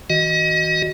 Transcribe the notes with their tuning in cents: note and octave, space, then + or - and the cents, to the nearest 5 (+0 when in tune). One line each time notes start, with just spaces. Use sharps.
D#3 +45 F#4 +0 D#5 +0